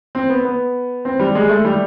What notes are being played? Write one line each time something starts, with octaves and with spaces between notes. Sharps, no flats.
C4
B3
B3
C4
G3
G#3
A3
G3